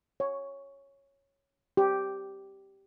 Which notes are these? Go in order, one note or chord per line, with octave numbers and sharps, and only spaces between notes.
C#5
G4